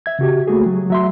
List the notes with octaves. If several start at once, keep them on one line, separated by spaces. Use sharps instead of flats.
E5 G#6
C#3 F#4 G4
A3 A#3 F#4 G#4
F#3
F#3 E5 C6